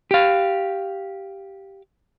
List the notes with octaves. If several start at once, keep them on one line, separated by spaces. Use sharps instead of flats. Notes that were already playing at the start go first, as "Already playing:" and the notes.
G4 F5